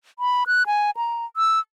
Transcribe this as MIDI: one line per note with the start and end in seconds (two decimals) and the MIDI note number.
0.19 0.44 83
0.47 0.66 90
0.66 0.91 80
0.97 1.25 82
1.37 1.59 88